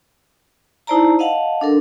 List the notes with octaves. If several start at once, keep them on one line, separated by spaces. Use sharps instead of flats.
D#4 E4 C5 D5 A5 A#5
D#5 F5 F#5 A5
D4 A4 A#4